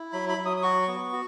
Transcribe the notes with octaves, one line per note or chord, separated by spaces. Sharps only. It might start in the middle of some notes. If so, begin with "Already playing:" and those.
Already playing: E4
F#3 B5
B5
F#3
D#6
D#6
F#4 C#6
B3
F#4